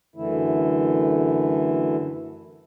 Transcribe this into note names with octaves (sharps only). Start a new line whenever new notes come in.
F#2 D3 E3 A3 E4